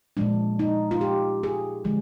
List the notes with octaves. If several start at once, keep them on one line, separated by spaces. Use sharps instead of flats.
A#2 F3 G#3 D4
D#4
F4
G4
G#4
D3 F3 G#3